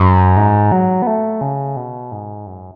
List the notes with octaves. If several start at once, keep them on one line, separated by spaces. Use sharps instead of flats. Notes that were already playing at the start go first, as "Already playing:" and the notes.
Already playing: F#2
G#2
F#3
B3
A3
C#3
B2
G#2
F#2